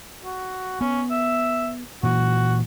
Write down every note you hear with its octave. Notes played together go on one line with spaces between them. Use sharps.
F#4
B3 C#4
E5
A#2 E3 F#4